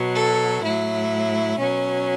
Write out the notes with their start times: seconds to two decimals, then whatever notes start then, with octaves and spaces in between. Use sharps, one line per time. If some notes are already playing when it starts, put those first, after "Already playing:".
Already playing: B2 F#3
0.15 A4
0.63 A2 F#3 E4
1.59 B2 F#3 C#4